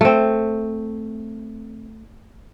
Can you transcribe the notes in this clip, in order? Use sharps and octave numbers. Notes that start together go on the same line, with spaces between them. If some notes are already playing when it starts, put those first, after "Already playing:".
A3 C4